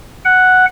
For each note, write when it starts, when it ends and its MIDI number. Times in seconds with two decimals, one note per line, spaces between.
0.25 0.65 78